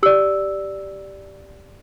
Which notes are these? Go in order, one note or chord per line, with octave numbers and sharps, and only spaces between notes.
G4 D5 E6